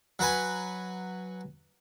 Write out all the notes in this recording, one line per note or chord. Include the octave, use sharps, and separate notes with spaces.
F#3 F#4 B4 G#5